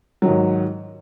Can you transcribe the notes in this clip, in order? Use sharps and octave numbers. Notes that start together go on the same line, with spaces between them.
G#2 D#3 F#3